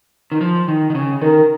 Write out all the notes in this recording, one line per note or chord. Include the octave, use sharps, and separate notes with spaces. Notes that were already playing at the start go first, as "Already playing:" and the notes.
D#3
F3
D#3
D#3
C#3
D#3 A#4